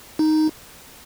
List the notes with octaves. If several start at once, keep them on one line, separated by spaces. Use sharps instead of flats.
D#4